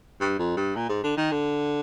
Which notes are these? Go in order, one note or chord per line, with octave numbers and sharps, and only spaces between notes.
G2
F2
G2
A#2
G#2
D3
D#3
D3